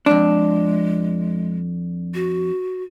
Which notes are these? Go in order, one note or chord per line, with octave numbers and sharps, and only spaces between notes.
F2 G#3 D4
F#4